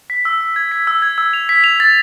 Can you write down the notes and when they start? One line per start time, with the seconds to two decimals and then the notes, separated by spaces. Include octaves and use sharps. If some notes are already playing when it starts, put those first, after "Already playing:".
0.10 B6
0.25 E6
0.41 E6
0.56 G#6
0.72 B6
0.87 E6
1.02 G#6
1.18 E6
1.33 F7
1.49 B6
1.64 F7
1.80 A6